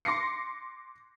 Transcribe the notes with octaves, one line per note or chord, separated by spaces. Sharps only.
C6 D6 A#6 C7 C#7